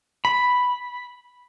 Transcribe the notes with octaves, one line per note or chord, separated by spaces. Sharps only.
B5